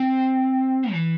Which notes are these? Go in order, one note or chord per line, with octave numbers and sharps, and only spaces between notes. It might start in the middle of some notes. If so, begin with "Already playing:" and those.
Already playing: C4
E3